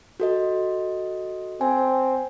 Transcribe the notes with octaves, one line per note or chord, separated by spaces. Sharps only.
F#4 A4 D#5
C4 G#5